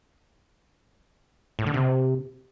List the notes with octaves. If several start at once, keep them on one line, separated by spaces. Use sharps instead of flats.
A2
D3
C3